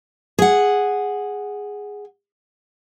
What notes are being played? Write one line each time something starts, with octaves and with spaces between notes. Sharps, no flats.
G#4 F#5